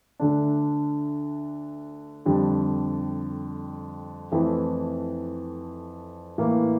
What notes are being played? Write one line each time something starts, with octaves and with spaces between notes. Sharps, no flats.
D2 D3 A3 D4
F2 D3 G3
F2 E3 A3 E4
A2 E3 A#3